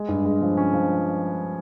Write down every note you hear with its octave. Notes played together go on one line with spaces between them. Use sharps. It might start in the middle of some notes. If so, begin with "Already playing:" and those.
Already playing: G#3
G2
G#3
F3
C#4
F3